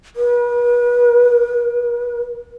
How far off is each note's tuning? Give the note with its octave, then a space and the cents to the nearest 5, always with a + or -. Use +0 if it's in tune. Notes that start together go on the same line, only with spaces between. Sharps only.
B4 -40